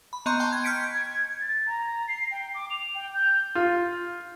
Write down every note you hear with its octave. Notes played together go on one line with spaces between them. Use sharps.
B5
B3 D#5 A#5 C6 C#6 G6
G5 A5 C6 F#6
G#6
F6 G6 G#6 B6 C#7 D7
G#6
A6
A#5
C7
G5
D6
F7
G5
G6
F4